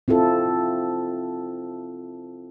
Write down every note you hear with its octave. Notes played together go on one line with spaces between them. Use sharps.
C4 E4 F4 A4